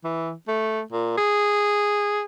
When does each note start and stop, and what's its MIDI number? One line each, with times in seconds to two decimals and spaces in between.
0.04 0.32 52
0.48 0.81 57
0.92 1.16 46
1.17 2.22 68